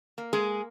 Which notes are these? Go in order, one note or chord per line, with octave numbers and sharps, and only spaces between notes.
A#3
G#3 G#4